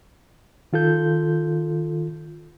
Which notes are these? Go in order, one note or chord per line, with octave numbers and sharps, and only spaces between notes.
D#3 F4 A4 G6